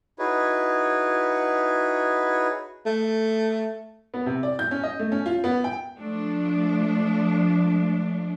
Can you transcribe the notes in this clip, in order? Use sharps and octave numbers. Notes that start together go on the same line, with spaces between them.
D#4 E4 F#4 G#4 B4 C#5
A3
B3
C3
D5
G6
C#4
D#5
A3
C#4
F4
B3
G5
F3 A3 D4